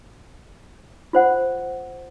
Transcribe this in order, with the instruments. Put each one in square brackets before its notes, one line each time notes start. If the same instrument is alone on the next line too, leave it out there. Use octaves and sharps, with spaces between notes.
[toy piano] F4 C5 F#5